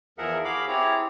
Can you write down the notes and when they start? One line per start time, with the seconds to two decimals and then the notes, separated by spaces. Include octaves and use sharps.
0.18 E2 F3 G#4 A#4 E5 F#5
0.45 F#4 G#4 F5 B5 D6
0.68 C4 E4 G4 G#4 C#5 A#5